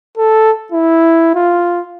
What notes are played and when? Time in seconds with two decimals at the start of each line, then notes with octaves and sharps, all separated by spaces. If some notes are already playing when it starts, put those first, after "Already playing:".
0.17 A4
0.72 E4
1.35 F4